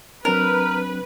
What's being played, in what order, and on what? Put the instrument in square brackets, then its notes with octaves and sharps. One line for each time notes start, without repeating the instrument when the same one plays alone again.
[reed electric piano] F#3 C4 D4 [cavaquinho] A#4 [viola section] B4 [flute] F6